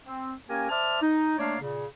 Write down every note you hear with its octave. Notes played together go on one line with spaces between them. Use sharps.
C4
A#3 C#4 G4 A#4 G#5
C5 D5 E5 A5 F6
D#4
A3 A#3 D4 C#5 D5 F5
A#2 C#3